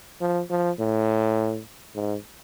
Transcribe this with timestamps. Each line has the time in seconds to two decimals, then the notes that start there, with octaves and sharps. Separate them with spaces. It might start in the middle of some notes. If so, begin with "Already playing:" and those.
0.21 F3
0.50 F3
0.79 A2
1.95 G#2